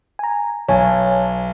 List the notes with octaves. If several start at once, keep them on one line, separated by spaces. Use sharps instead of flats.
G#5 A#5
B1 C#5 G#5 A5